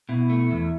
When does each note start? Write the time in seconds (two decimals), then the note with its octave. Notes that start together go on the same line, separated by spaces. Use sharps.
0.09 B2 E4
0.30 A3
0.51 E2